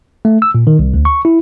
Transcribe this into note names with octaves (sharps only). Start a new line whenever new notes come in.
A3
E6
A#2
D#3
C2
D2
C#6
E4